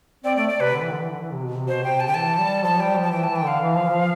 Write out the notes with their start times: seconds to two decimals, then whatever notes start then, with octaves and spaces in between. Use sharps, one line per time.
0.24 C4 D5
0.37 A3 D5
0.49 D5
0.60 C3 B4
0.73 D3
0.82 E3
0.91 D3
1.01 E3
1.10 D3
1.21 E3
1.32 C3
1.44 B2
1.56 C3
1.68 B2 C5
1.84 C3 G5
2.00 C3 A5
2.07 D3 G5
2.14 E3 A5
2.40 G3
2.64 F3 A5
2.80 G3 G5
2.96 F3
3.03 A5
3.11 E3 G5
3.24 E3 A5
3.36 G5
3.44 D3 F5
3.60 E3
3.76 F3
3.87 E3
3.91 F3